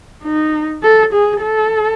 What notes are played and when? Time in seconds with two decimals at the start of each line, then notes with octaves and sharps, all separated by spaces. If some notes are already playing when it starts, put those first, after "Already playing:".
0.24 D#4
0.83 A4
1.13 G#4
1.42 A4